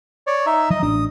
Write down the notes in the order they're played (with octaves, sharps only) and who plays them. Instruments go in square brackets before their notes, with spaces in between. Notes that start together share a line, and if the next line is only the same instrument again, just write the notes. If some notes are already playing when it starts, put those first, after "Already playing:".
[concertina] C#5 D5
D#4 E5
[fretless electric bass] F3 [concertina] D#5
[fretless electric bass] A1 D4 [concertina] D#6